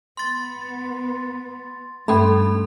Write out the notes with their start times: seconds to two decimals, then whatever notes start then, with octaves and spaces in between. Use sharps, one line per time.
0.17 B3 C6 A6
2.08 G2 A3 C#4 A4 B5